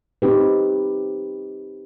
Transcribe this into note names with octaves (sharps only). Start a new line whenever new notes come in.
C4 D#4 G4 B4